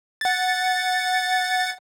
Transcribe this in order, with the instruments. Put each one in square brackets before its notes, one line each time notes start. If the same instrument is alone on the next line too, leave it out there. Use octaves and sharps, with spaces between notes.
[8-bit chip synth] F#5 A6